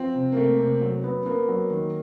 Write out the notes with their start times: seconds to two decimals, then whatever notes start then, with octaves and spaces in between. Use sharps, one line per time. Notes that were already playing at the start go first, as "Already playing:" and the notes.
Already playing: F3 C4
0.15 C3
0.32 A#3
0.37 C3 A3
0.59 C3
0.81 F#3
1.04 B3
1.26 A#3 B3
1.48 F#3
1.71 D#3